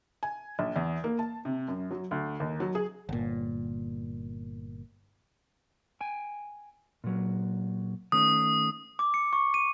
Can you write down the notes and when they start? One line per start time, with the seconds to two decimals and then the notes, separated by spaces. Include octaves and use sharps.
0.23 G#5
0.59 A#1
0.76 E2
1.04 A#3
1.19 A5
1.45 C3
1.68 F#2
1.91 F#3
2.11 D2
2.40 D#2
2.60 F#3
2.75 G#4
3.09 G1 A#2
6.01 G5 G#5
7.04 A#2 F#3
8.12 D#3 A3 C#4 D#6
8.99 D6
9.14 C#7
9.33 C#6
9.54 D#7